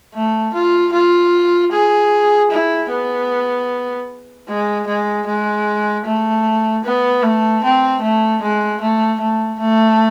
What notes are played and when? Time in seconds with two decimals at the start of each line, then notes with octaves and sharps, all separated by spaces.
0.15 A3
0.54 F4
0.93 F4
1.71 G#4
2.51 E4
2.90 B3
4.48 G#3
4.87 G#3
5.26 G#3
6.05 A3
6.85 B3
7.23 A3
7.63 C4
8.02 A3
8.42 G#3
8.81 A3
9.21 A3
9.60 A3